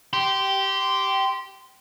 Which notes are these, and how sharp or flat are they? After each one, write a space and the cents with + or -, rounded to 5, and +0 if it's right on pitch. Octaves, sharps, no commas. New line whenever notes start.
G4 -15 C6 -10